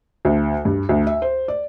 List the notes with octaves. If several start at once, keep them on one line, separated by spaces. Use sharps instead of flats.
D2
G2
D2
E5
C5
D5